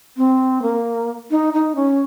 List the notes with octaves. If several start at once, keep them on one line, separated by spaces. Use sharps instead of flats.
C4
A#3
D#4
D#4
C#4